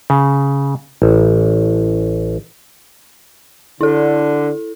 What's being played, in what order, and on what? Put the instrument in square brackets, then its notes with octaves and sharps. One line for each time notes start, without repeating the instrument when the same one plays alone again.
[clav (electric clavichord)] C#3
A1
[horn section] D3 [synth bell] E4 A4